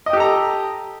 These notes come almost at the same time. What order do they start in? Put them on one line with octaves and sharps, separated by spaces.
D#5 G5 G4 A4 A#5